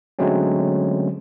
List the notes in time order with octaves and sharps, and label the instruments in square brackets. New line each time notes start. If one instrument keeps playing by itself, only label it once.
[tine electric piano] D3 F#3 G#3 A3 C4 C#4